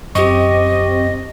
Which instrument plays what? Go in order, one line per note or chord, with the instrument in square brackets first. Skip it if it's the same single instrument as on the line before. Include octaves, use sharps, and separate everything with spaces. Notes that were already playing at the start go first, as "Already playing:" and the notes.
[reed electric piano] F#2 [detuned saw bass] C4 [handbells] G4 C#6 [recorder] D#5